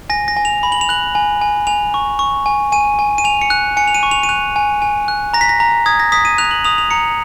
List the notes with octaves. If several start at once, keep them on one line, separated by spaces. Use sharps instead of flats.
G#5 A#6
A#6
G#5
F7
B5
F#7
F7
F#6 F#7
G#5
G#5
G#5 F7
C#6
C#6
G#5
G#5 D#7
G#5
D#7
G#5 F7
C#7
F#6
G#5 C#7
F7
D#7
C#6
F7
D#7
F#6 F7
G#5
G#5
F#6
A#5 A#6
B6
A#6
A#5
D#6 G#6
A#6
D#6 B6
D#7
F#6 F7
F#7
D#6 F7
F7
A#5 C#7